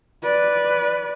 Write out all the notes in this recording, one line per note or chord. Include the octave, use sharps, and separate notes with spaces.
B4 D5